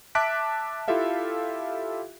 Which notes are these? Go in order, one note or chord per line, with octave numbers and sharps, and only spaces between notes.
E5 A5 D6 F#6 B6 D7
E4 F4 G4 A4 E5 F5